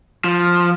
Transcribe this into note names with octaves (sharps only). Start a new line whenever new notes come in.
F3